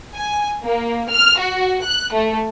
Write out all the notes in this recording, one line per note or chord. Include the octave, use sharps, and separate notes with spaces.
G#5
A#3
F6
F#4
F#6
A3